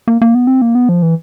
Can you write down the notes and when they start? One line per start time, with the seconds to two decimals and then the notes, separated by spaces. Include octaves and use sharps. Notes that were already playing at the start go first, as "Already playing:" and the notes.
0.08 A#3
0.22 A#3
0.35 B3
0.47 C4
0.62 A#3
0.75 B3
0.89 F3
1.02 E3